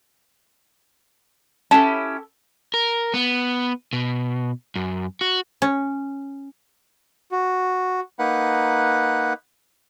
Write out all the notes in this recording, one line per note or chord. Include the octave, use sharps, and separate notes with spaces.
C#4 E4 G4 A4 A5
A#4
B3
B2
F#2
F#4
C#4
F#4
A#3 D#4 B4 F#5